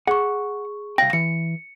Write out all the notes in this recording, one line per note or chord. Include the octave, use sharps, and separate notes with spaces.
G#4 F#5 C#6
C2 F5 G5 A#6
E3 C#7